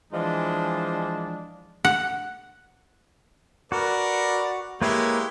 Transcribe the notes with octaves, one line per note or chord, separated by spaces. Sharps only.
E3 F3 G#3 D4
F#5
F#4 A#4 B4 D5
G#3 A#3 E4 G4 B4 C#5